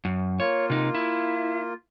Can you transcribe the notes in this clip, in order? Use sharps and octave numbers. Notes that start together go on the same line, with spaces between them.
F#2
A#3 F4 C#5
C3 D#4
E4